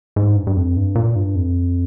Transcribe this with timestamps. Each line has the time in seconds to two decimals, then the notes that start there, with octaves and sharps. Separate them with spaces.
0.16 G#2
0.37 G2
0.47 G2
0.56 F2
0.77 G2
0.95 A#2
1.16 G2
1.36 F2